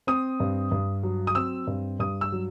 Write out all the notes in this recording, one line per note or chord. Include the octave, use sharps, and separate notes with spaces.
C4 D#6
G2
G2
F#3
D#6
C4 E6
G2
G2 D#6
E6
F#3